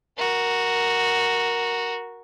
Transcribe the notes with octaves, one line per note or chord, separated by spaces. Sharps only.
F#4 A#4